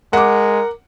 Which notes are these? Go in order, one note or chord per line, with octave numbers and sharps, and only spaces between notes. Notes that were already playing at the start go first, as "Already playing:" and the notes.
G#3 A#4 F#5 D6